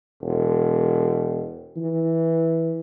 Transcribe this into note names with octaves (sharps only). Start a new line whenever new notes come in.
E1
E3